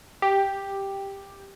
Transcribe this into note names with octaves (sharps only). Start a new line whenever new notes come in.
G4